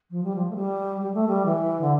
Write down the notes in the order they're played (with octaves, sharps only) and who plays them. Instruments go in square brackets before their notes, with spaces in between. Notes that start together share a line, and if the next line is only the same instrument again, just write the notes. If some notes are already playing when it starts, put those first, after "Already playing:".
[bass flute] F3
G3
F3
A3
G3
G3
A3
G3
E3
D3